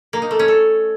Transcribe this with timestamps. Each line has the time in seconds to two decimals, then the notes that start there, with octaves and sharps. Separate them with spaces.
0.13 A#3
0.22 D#4
0.31 A3
0.39 C#4
0.48 A4